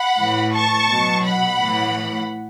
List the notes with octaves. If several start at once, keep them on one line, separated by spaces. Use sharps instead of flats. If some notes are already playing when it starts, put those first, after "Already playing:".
Already playing: F#5 B5
A2 E3
A5 C#6
B2 F#3
F#5 B5
A2 E3